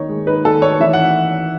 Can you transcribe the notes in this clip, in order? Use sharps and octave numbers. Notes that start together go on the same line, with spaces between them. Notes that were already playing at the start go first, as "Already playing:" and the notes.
Already playing: D#3 D#4 C#5
G#3
D#4 B4
D#3 A4
D#4 C#5
E3 E5
F#5